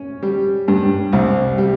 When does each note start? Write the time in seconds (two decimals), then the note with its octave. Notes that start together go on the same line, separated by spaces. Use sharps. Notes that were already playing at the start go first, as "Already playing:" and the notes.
Already playing: C#4
0.23 G3
0.68 G2
1.13 C2
1.58 G3